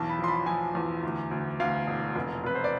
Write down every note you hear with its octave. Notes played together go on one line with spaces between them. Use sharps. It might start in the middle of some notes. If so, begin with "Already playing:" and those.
Already playing: B1 E2 A5
B5
F3 C6
B5
F3 G#5
E2
D2
D2
D2 F5
E1
F1
F1 B4
C5
D5